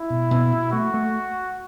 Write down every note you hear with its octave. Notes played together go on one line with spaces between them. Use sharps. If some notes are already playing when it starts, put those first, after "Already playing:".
Already playing: E4
B2
B2
B2
A3 F#4
A3